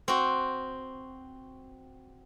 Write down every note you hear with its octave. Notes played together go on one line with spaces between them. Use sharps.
C4 F#4